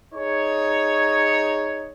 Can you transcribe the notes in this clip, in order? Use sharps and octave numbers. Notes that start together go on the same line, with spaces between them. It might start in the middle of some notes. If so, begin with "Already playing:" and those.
D#4 G#4 C#5